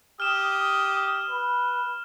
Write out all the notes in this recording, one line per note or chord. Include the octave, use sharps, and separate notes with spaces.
G4 D#6 F6 E7
B4